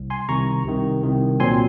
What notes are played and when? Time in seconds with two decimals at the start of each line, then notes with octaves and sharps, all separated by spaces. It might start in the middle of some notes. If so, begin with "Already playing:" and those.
Already playing: C2
0.10 G#5 C6
0.29 C2 C3 D#3 A#5 C#6
0.65 C2 C3 D#3
1.03 C2 C3 D#3
1.40 A#2 F#3 C4 G#5 C6